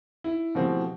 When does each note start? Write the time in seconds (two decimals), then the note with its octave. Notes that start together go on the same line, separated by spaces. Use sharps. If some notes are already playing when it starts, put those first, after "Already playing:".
0.24 E4
0.55 B2 E3 F3 A3 C4 G4